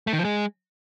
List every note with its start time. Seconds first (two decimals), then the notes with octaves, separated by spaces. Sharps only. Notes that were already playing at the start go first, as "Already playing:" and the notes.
0.07 A3
0.13 D#3
0.19 F3
0.25 G#3